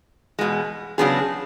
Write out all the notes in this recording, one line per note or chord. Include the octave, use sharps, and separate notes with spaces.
E2 B2 G#3
C#3 F#3 B3 D4 G#4